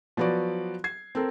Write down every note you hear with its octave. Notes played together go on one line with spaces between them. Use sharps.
F3 F#3 B3 F#4 D5
G#6 C7
C4 A4 A#4